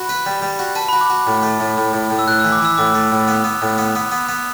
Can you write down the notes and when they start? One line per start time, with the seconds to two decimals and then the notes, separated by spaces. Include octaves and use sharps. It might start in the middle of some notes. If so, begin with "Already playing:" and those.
Already playing: F#4 B5
0.09 B4
0.26 G3
0.42 G3
0.59 F#4
0.75 B4 A5
0.89 B5
0.93 F#4
1.01 D6
1.10 F#4
1.27 A2
1.43 A3
1.60 A2
1.77 A2
1.93 A2
2.10 A2
2.19 E6
2.27 A2 F#6
2.40 E6
2.44 E3
2.52 D6
2.61 E3 E6
2.78 A2 D6
2.95 A3
3.12 A2
3.28 B3
3.44 B3
3.62 A2
3.78 B3
3.95 B3
4.12 B3
4.29 B3